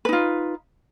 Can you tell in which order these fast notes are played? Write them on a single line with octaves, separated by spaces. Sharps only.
B4 D#4 F4